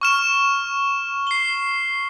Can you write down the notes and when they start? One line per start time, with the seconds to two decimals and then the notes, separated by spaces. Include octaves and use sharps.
0.01 C#6 F6 E7
1.27 C7 G7